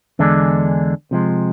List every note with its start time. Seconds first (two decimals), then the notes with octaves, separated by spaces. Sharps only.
0.19 E2 D3 G#3 D4
1.11 C3 F3 G#3